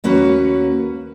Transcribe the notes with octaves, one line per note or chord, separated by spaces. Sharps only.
D#2 A#3 C#4 F#4 B4